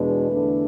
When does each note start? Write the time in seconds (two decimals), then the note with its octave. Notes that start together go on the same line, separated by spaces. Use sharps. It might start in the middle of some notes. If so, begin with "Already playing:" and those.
Already playing: E2 B2 G#3 D4 B4
0.30 E2 D3 A3 D4